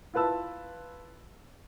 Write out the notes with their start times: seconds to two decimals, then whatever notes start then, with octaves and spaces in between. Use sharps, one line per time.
0.14 E4 F4 B4 A5 E6